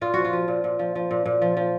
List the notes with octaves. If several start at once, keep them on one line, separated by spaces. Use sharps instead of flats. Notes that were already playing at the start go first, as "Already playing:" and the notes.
A#2 F4
F3 F#4
F4
F3
A#2
A#2
F3
F3
A#2
A#2
F3
F3